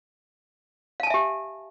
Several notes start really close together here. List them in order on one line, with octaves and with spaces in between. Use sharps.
F5 A5 G#5 E5 G4